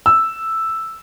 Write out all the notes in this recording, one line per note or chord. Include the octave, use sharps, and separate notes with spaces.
E6